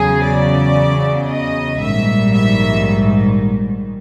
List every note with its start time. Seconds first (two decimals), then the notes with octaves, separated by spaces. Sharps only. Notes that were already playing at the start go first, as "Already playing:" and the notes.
Already playing: E2 C#3 F#3 G#4
0.24 D5
1.29 D#5
1.81 A#1 G#2 D#3 G3 E5
2.34 E5